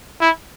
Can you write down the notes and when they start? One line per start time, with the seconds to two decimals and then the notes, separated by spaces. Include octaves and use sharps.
0.21 E4